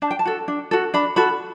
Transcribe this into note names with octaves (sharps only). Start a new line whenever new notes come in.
D4 A5
G5
A5
F#4 A4
D4
F#4 A4
D4 B5
F#4 A4 B5